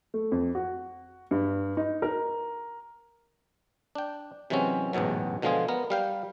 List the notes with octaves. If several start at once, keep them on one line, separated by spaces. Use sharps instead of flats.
A3
F2
F#4
G2
D#4
A#4
D4 G5
C3 E3 F#3 G#3 C4 C#4
A1 E2 G#2 B2 F#3
B2 D3 F3 G#3 F4 G#4
B3 A#4
G3 F5 G5